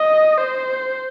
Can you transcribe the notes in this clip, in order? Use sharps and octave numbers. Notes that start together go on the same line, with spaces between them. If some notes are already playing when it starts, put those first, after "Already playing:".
Already playing: D#5
C5